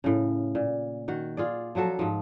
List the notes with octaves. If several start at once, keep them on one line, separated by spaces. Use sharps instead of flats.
A2 C#3
A#2
D#3 F#4
F4 G#4 D5
F3 F#3 F#4 A4
G#2 F3